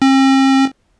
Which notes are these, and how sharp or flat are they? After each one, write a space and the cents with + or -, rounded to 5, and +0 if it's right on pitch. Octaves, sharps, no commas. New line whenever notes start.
C4 +45